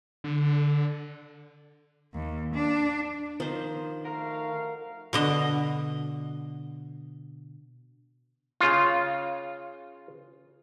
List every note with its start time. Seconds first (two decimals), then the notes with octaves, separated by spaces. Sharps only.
0.24 D3
2.15 D#2
2.54 D4
3.40 D#3 F3 C5
4.05 A3 F#4 A#4 F5
5.13 B2 D3 D#5
8.61 C#3 F4